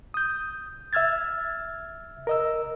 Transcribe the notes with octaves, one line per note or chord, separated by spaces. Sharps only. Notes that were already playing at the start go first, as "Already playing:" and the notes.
D#6 G6
E5 E6 F6 G#6 A6
A#4 D#5 E6